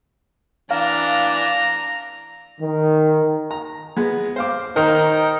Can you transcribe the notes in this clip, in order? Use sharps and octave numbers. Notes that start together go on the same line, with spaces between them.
E3 D4 F5 A#5
D#3
A#5
G#3 B3
C5 F5 D6
D#3 D#4 A#4 C5